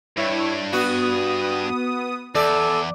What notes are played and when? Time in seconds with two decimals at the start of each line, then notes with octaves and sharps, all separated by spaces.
0.17 G2 E4 C#5
0.73 B3 F#4 D#6
2.35 E2 A4 D5